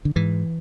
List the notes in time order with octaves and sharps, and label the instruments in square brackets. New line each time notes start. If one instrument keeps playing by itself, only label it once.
[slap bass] D3
G#2 E3